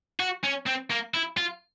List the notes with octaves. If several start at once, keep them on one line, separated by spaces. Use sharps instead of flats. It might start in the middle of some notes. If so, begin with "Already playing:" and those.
F#4
C#4
C4
A#3
E4
F4